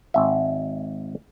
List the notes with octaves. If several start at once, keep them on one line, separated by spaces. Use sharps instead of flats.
G#1 E5